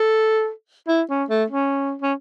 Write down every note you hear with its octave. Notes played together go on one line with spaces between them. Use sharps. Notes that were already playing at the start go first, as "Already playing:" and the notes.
Already playing: A4
E4
C#4
A3
C#4
C#4